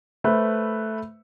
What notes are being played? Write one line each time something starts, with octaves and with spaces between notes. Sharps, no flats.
A3 B4 C5 E5